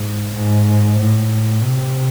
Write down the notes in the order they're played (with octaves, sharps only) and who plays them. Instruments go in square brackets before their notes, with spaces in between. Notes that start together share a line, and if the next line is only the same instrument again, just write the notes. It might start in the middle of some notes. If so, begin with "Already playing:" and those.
Already playing: [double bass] G#2
G#2
A2
C3